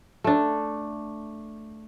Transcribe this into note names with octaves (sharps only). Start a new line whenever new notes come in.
A3 D4